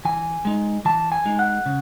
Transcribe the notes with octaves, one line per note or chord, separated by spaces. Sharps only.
E3 G#5
G#3 D#4
E3 A5
G#5
G#3 D#4
F#5
C#3